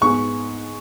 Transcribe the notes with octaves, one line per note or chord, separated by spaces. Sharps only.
G#2 G#3 B3 G#4 C#6